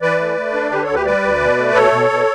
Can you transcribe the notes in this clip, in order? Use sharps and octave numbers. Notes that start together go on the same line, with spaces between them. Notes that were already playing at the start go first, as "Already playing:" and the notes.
E3 B4 D5
A3
A3
D4
D3 G4 B4
D2 A4 C#5
G4 B4
G3 B4 D5
D2
B2
A3
B2 A4 C#5
B2
B2